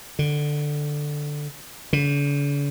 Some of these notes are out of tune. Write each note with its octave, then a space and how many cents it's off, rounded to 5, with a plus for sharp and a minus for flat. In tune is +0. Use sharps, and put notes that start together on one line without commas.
D3 +5
D3 -45